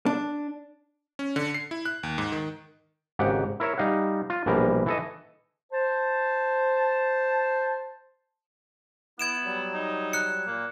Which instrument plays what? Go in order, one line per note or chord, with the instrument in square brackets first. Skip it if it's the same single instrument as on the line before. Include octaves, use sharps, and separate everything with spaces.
[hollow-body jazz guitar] D4
[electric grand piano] C#4
D3
C7
E4
F#6
D#2
G#2
D#3
[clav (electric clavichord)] G#1 G#2 C#3 G4 F#5
E4 A#4 C#5 E5
G3 D#4 F5 F#5
F4
A#1 B2 E3 G3 A#4
E3 A4 D#5
[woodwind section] C5 A5
[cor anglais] B3 [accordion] E4 [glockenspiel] G#6 D7 E7
[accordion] F#3 G3
[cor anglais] D#4
[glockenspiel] F#6 C#7
[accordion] A#2 [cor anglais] A#3